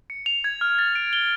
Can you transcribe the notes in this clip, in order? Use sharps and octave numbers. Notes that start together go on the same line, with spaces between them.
C#7
F7
G#6
F6
A6
D7
G7